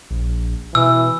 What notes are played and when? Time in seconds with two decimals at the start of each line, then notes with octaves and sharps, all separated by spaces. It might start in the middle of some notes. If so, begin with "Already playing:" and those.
0.11 A#1
0.75 B2 E3 E6